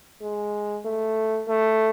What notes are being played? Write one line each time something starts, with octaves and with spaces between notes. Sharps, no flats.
G#3
A3
A3